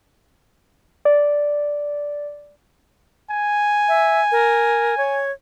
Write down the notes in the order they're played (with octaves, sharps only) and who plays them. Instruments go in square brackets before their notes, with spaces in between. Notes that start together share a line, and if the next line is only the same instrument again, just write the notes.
[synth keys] D5
[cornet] G#5
[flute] E5
A#4
C#5